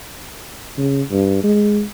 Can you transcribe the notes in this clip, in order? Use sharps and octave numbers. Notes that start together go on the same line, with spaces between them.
C#3
G2
G#3